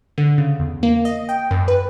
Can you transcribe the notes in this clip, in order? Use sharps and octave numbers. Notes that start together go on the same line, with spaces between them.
D3
C#3
E2
A#3
D#5
G5
F#2
B4